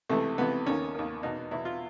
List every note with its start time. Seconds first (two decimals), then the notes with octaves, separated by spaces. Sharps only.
0.09 C#2 C3 E3 A3
0.38 C#2 C3 E3 B3
0.66 D#2 D#3 C#4
0.95 D#2 D#3
1.23 E2 B2 D#4
1.51 E2 B2 E4
1.65 F4